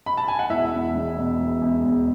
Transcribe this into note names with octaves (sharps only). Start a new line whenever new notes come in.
B5
A5
G#5
F#5
E1 E4 E5
E2
E1
B2
E1
E2
E1